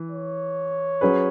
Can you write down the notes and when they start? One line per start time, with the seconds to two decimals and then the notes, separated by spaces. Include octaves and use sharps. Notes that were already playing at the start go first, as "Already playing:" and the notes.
Already playing: E3
0.11 C#5
1.01 F#3 C#4 G#4 B4